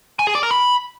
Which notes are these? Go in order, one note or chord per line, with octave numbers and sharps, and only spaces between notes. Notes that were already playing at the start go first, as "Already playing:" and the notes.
G#5
G#4
D5
A#4
B5